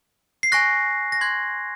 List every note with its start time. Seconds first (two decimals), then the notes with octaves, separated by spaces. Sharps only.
0.43 C7
0.52 G#5 C#6 F#6 A#6
1.12 A#6
1.21 C6 F#6 G#6